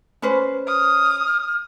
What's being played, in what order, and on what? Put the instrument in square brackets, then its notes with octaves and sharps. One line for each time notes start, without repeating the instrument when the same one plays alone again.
[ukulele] C#4 B4 C5
[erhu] D#6 [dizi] F6